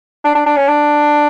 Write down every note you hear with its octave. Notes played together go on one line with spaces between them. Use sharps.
D4
D4
D4
C#4
D4